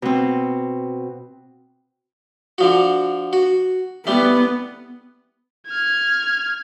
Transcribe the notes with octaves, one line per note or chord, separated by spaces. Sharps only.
B2 C4
D3 F3 F#4
F#4
G3 A3 B3
F6 G#6